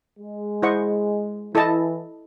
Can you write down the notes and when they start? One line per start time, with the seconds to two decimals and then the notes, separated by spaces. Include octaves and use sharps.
0.16 G#3
0.62 E4 C5 D#5 F#5 C#6
1.55 E3 E4 A4 D#5 A5